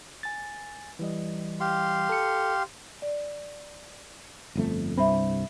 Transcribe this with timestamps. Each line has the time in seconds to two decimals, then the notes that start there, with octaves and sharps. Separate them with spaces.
0.23 G#5 A6
0.99 E3 G3 D#5
1.60 G4 F5 C6
2.09 A4 C#7
3.02 D5
4.55 G1 F2 A3
4.97 C2 G2 C4 E5 B5